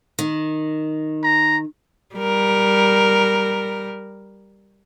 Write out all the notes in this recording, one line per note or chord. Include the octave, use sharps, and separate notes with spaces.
D#3
A#5
G3 A#4